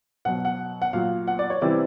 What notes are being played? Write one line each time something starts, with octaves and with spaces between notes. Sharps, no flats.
B2 F#3 F#5
F#5
F#5
A#2 F#3 F5
F#5
D5
C#5
C3 E3 G3 D5